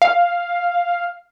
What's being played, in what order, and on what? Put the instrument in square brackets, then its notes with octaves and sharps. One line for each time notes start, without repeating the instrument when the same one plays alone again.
[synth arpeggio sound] F5